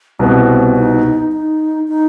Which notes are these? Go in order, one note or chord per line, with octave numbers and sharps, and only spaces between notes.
C2 B2 B3 C4
D#4
D#4
D#4